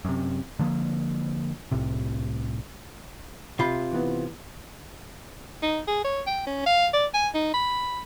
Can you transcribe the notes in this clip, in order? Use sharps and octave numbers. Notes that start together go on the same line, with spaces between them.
F#2 C3
D3 F3 A#3
C2 A2 C3
C3 F4 B5
E3 B3
D#4
G#4
C#5
G5
C#4
F5
D5
G#5
D#4
B5